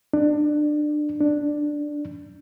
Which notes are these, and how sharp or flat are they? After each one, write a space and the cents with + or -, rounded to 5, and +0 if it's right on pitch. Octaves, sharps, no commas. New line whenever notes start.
D4 +25
D4 +5